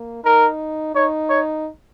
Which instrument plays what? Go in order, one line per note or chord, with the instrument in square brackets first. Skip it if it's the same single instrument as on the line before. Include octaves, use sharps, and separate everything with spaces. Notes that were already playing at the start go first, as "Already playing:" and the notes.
Already playing: [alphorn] A#3
[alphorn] D#4 [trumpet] A#4
[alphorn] D#4 [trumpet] C#5
[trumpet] C#5